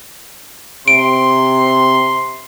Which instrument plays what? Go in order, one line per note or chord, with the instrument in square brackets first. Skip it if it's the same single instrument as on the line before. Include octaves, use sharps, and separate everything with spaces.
[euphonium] C3 [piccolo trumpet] C6 [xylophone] D7